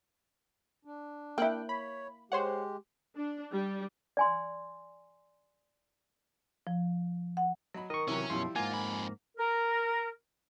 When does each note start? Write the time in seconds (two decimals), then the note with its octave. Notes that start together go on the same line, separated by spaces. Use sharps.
0.85 D4
1.38 A#3 E4 G5 F#6
1.69 C#5 B5
2.32 G#3 G4 C5 C#5 F#5
3.16 D4
3.53 G3
4.17 D5 G#5 C6
6.67 F3
7.37 F#5
7.74 F#3 D#5 B5
7.90 D#3 A#4 D#5 C#6
8.08 C3 D#3 E3 F#3 C#4 E4
8.30 F#2 B2 F3 G3 E4 C6
8.56 G#2 A#3 F4 F#5 G#5
8.71 F2 B5
9.37 A#4